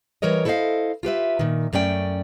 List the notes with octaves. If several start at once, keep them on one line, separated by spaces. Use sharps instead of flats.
E3 G3 A#4 C#5 D#5
E4 A4 C5 C#5 D#5 F5
F4 G4 B4 E5
A#2 D#3
F#2 A3 C#4 D5 G5